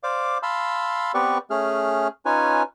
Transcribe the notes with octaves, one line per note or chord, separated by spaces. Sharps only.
C5 D5 F5 D6
F5 A5 B5 C6 E6
B3 C4 G4 B4 D5 C#6
A3 C#4 G#4 F6
C#4 D#4 F4 B4 C#5 G#5